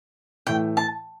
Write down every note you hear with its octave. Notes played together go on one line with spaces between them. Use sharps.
A2 E3 A3 G5
A5